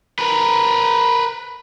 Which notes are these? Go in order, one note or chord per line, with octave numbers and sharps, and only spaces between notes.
A#4 B4